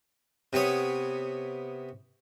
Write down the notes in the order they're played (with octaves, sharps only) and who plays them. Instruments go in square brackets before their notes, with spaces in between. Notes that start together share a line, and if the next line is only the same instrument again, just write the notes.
[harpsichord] C3 B3 C#5 D#6